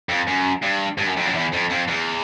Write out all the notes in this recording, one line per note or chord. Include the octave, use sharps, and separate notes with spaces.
F2
F#2
G2
G2
F#2
F2
F#2
E2
F2
F2
E2